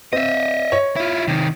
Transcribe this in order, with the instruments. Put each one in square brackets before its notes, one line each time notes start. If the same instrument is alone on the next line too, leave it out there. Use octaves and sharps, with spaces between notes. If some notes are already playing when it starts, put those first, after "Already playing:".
[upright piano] C4 [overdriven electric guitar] D#5 E5
[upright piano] C#5
[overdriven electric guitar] E4 F4
C3 D#3